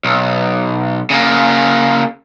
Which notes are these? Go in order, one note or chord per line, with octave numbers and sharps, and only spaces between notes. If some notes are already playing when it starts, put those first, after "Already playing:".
B1
C#3 A#3